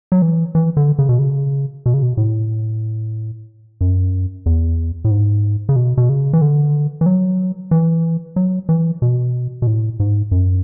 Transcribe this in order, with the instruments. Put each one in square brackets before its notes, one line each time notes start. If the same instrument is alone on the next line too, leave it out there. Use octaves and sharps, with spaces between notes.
[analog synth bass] F#3
E3
E3
D3
C#3
B2
C#3
B2
C#3
B2
A2
F#2
E2
A2
G#2
C#3
B2
B2
C#3
E3
D3
E3
F#3
E3
F#3
E3
B2
B2
A2
G#2
F#2